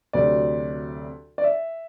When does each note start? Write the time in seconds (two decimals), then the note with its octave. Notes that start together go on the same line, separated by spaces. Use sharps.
0.13 D2 C3 F#3 D5
1.38 D5
1.44 E5